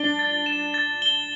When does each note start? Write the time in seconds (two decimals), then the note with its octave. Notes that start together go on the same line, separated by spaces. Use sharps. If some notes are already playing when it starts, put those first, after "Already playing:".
Already playing: D4 G7
0.19 A6
0.46 E7
0.74 A6
1.02 G7